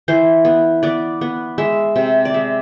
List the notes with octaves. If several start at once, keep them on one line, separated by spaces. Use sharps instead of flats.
E3 C5
B3
B3 D5
B3
G#3 E5
C3 E5
D5
G#3 E5